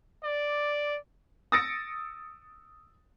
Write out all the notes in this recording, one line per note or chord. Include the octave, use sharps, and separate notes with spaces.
D5
D#6 E6 A6 A#6 C#7 D7